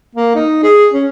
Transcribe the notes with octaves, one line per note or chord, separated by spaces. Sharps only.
A#3
D#4
G#4
C#4